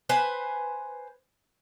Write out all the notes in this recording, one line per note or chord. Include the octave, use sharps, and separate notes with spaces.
B4 C5 G#5